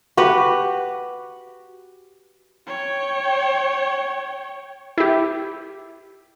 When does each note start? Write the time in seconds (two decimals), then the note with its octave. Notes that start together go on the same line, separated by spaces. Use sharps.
0.17 F#4 G4 B4
2.67 C#5 G5
4.98 E4 G4